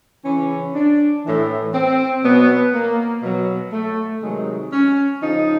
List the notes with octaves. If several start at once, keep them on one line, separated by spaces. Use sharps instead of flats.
C#3 E3 C#4
D4
A2 E3
C4
B2 F#3 B3
A#3
B2 F#3
A3
C3 D#3 F#3 G#3
C#4
C#3 F3 D#4